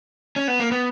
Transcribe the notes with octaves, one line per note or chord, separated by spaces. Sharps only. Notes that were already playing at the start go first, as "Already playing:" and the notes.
C#4
B3
A#3
B3